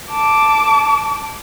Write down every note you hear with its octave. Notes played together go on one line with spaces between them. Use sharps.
A5 D6